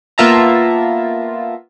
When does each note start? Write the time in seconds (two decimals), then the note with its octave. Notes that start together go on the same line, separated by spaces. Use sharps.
0.18 A#3 B3 F4 E5 A5 A#5